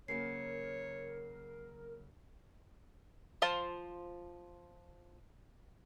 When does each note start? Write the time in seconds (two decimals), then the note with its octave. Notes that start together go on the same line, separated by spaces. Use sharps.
0.08 C#3 F#3 A#3 A#4 C#5 C7
3.42 F3 F4 C5 A5